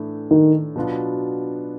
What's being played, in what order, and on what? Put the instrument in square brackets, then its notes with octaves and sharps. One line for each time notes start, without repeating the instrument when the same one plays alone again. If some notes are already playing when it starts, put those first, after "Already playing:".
Already playing: [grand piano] A2 E3 A3 D4
[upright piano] D#3
[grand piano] B2 F#3 B3 D4 F4